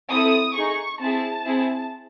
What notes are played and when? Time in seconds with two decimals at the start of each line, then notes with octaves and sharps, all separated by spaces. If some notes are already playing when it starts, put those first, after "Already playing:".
0.11 C4 E4 A4 D#6
0.56 D#4 G#4 C#6
1.00 C4 E4 G#4 A5
1.45 C4 E4 G#4